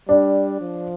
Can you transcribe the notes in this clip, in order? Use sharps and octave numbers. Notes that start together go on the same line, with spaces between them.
G3 D4
F3